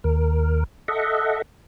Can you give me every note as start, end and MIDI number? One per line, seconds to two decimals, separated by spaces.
0.04 0.64 39
0.04 0.64 70
0.88 1.42 69
0.88 1.42 75
0.88 1.42 76
0.88 1.42 78